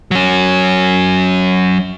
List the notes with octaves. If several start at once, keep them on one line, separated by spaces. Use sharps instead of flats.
F#3 C#4